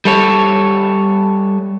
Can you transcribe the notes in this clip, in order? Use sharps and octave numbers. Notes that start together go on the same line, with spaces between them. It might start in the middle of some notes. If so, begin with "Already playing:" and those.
G3 A4 C#5